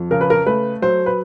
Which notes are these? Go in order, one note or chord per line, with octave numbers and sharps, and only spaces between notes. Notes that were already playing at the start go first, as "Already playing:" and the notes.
Already playing: F2
C#3 A#4
B4
A#4
A3 B4
F#3 C5
B4